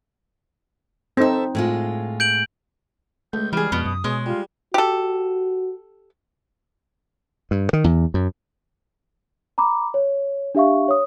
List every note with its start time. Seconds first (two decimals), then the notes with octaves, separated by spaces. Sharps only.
1.17 C4 D#4 A4 E5
1.55 A2 G#3 F4
2.20 G6 D7 F#7
3.33 C#2 A3 G6
3.53 E3 G3 G#4 F6
3.72 F2 B2 B3
3.86 F#2 D#6
4.04 B2 G#3 C#4
4.26 G3 F4
4.74 F#4 G4 A4
7.51 G2
7.73 D#3
7.84 E2
8.14 F#2
9.58 A#5 B5 D6
9.94 C#5
10.55 D4 G4 E5 F5 C#6
10.88 C#5 D#6